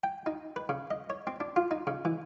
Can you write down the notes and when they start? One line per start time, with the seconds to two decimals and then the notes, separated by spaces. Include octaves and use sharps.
0.03 G5
0.26 D#4
0.56 B4
0.69 C#3
0.91 D#5
1.10 C#5
1.27 C4
1.40 D4
1.56 F4
1.71 D#4
1.87 C#3
2.05 E3